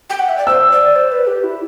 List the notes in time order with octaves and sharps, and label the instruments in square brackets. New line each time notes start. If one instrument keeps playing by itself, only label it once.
[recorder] G5
F#5
E5
D5
[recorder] C5 [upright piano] E6
[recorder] D5
C5
B4
G4
E4